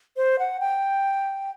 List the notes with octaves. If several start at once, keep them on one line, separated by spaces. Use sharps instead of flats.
C5
F#5
G5